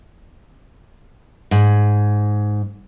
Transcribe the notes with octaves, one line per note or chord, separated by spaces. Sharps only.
G#2